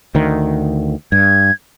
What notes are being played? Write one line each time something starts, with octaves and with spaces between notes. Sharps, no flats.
D2 D#3
G2 G#6